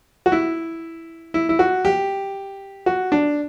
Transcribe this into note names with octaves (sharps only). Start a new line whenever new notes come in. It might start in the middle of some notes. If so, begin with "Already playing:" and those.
F#4
E4
E4
E4
F#4
G4
F#4
D4